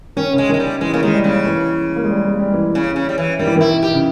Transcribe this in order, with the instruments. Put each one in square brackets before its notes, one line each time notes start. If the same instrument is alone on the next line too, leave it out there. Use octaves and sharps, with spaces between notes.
[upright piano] D#3 [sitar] C#4
[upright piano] C#3
[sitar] G#3
[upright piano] D#3
[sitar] G#3
G3
[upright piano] E3 [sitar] G#3
[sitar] C#3 [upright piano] A#3
[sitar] D#3 [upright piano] G#3
[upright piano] G3
[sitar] C#3
[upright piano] E3
A#3
G#3
G3
G#3
G3
E3
[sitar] C#3
C#3
G3
E3
[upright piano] D#3 [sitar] G3
[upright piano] E3
D#3
[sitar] E4
G4
[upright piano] C#3